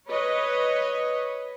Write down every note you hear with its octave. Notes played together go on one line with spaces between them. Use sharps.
B4 C#5 D#5